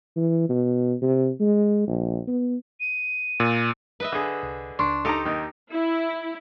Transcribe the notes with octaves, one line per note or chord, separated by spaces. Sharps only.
E3
B2
C3
G#3
A#1
B3
D#7
A#2
B4 D#5 E5
D3 G#4
C2
C#2 D4 C6 C#6
D#4 G4 A4 A#5
D#2 D#3
E4